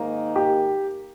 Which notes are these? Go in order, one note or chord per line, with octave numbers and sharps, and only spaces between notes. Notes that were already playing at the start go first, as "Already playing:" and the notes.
Already playing: G#2 D#3 A#3 D#4 A#4
G4